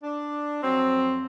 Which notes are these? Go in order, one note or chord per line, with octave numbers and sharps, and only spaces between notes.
D4
F2 F#3 C4